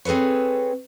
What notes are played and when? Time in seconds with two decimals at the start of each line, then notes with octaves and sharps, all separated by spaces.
0.05 C4 G#4 A4 B4 C#5